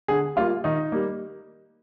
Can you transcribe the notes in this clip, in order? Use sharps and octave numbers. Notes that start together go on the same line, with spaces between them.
D3 G#4
G3 A#3 F4
D#3 D#4
G3 A#3